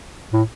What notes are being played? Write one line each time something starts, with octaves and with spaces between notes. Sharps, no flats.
A2